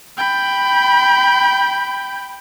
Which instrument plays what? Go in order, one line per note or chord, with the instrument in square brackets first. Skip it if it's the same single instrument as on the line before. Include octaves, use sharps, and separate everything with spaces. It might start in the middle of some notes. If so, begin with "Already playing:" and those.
[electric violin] G5 B5